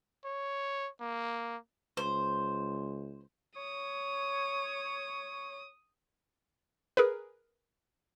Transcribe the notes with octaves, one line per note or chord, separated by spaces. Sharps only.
C#5
A#3
C#2 C5
C#5 D#6
G#4 A#4 B4